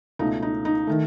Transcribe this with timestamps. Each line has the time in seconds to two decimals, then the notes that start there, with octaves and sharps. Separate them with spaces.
0.19 C#2 B2 A3 D#4
0.42 D#4
0.65 D#4
0.87 D#3 A3